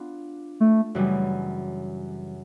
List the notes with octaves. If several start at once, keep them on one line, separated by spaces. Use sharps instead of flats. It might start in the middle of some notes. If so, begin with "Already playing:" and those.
Already playing: B3 D4 F4
A3
F#2 C#3 E3 G3